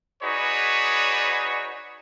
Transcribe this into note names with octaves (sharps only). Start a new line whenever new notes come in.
D#4 F#4 G#4 B4 C#5 D5